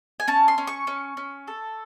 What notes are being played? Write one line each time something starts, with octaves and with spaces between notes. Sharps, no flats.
G#5
C#4 A5
C6
C#4
C#6
C#4
C#4
A4